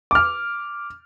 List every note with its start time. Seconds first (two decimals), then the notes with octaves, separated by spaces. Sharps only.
0.11 D6 F6